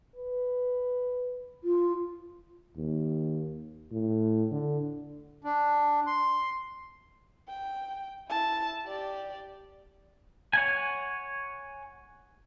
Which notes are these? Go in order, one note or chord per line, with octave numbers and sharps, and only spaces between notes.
B4
F4
D#2
A2
D3
D4
C6
G5
E4 A5
G4 D5
C#5 F#5 G#5